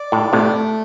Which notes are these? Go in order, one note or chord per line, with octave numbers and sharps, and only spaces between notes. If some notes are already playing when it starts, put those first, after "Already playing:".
Already playing: D5
A2
A2 C3 A3